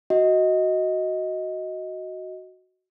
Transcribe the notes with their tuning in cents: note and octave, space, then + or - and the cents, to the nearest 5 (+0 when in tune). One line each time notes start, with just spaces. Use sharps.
F#4 +0 D#5 +15